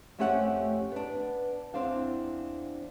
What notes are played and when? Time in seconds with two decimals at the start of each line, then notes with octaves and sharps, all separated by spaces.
0.19 F2 A3 C#4 G4 E5 F#5
0.92 B3 D4
1.74 E2 C4 D4 F5